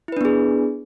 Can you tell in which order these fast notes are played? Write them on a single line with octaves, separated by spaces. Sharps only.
E4 B4 D4 B3 G#4